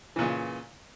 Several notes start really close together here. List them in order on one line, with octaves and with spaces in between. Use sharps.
E3 A#2 C#3